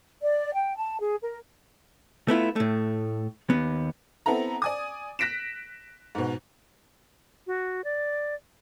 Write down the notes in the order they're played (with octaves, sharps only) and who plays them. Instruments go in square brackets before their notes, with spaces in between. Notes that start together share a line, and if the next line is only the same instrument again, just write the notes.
[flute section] D5
G5
A5
G#4
A#4
[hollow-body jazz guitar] A3 B3 E4 F4
A2 A3
D#2 B3
[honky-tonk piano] B3 C4 E4 A4 A#5
D5 G#5 D#6
F#6 A#6 B6 D7 E7
G#2 B2
[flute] F#4
D5